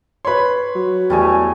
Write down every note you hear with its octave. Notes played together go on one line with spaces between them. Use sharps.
B4 C#5 B5 C6
F#3
E2 G3 A3 G#5